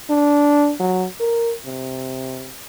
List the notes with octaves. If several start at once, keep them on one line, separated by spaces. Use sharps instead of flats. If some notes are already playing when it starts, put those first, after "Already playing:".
D4
F#3
A#4
C3